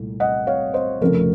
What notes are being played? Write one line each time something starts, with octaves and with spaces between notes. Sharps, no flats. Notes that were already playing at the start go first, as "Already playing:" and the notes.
Already playing: C2 A#2 A3
D#5 F#5
C#5 F5
C5 D#5
F1 F2 C#3 A3 A#4